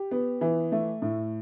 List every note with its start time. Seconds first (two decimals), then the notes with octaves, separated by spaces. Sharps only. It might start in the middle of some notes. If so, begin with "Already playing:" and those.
Already playing: G4
0.11 B3
0.41 E3
0.72 A3
1.02 A2